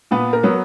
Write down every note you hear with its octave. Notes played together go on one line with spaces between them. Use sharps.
A#2 B3 B4
A#4
F#3 B3